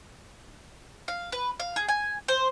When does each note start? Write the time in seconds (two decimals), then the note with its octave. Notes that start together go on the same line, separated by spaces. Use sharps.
1.08 F5
1.32 B4
1.60 F5
1.76 G#4
1.88 G#5
2.28 C5